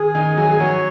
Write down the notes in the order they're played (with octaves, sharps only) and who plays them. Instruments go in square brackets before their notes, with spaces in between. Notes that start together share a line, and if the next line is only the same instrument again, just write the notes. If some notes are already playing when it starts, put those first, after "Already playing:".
Already playing: [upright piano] D#3 [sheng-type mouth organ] G#4
[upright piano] D#3 D#4 [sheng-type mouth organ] G#5
[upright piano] F#3 F#4 [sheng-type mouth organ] G#5
[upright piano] G#4
[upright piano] F#3 F#4 [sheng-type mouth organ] C#5